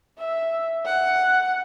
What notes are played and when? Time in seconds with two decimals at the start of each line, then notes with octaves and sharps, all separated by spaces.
0.18 E5
0.85 F#5